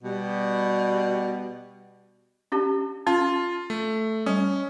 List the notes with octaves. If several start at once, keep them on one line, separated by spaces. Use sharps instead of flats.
B2 G3
C#4 D4 G4
C#4 F4
A3
G3 C#4